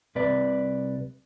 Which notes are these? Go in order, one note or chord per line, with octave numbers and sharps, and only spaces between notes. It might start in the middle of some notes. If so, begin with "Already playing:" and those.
C2 C3 B4 D5